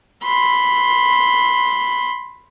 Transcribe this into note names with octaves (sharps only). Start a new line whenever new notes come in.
B5 C6